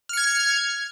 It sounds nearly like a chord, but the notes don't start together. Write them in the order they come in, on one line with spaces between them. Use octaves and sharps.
F6 C#7 G#6